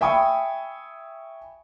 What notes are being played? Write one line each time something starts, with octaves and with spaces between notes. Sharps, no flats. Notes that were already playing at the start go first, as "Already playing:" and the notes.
E5 G5 G#5 B5 C#6 D#6